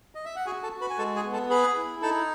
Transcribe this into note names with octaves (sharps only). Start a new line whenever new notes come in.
D#5
E5
F#5
F#4 G#4 G#5
A4 A5
F#4
B4 B5
G#5
G#3 A4 A5
G#4 G#5
B3
A4 A5
G#4 B4 B5
E4
D#4 A4 A5